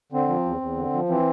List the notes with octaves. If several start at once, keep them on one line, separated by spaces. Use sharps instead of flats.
D3 C4
F3
E2
E2
D3
F3
E3 C4